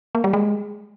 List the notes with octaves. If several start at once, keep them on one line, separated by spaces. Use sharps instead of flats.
A#3
G3
G#3